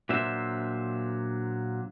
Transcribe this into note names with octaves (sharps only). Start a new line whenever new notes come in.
A#2 F#3 D4 C5 E5